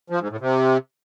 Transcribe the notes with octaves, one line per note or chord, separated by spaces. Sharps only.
F3
G#2
A2
C3